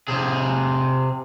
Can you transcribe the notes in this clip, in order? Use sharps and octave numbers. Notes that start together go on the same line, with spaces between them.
C3 G#4